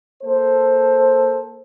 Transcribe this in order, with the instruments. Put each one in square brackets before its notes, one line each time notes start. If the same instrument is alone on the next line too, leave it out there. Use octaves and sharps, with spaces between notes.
[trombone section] A#3 A4 C5